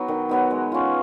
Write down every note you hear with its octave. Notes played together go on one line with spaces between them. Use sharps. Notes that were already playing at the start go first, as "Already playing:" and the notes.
Already playing: F#3 B3 D#4
D#3
F#3 B3 D#4
G#3
C#4 F4